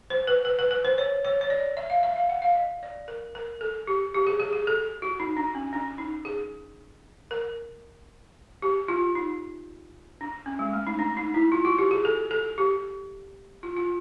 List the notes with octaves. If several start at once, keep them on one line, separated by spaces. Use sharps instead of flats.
C5
B4
B4
B4
B4
C5
C#5
C#5
C#5
D5
E5
F5
E5
F5
F#5
F5
D#5
D5
A#4
A#4
A4
G4
G4
G#4
G#4
G#4
A4
F#4
D#4
D4
C#4
D4
D#4
G#4
A#4
G4
F4
D#4
D4
C#4
G#3
A3
D#4
D4
D#4
E4
F4
F#4
G4
G#4
A4
A4
G4
F4
F4